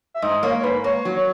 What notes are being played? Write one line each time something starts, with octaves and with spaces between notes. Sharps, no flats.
E5
G#2 D#5
A#3 C#5
C#5
G#2 B4
A#3 C#5
F#3
C#5